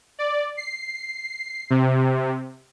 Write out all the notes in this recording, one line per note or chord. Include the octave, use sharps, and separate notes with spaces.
D5
C7
C3